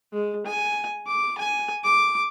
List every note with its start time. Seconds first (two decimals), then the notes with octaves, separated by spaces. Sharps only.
0.13 G#3
0.46 G#5
1.07 D6
1.38 G#5
1.84 D6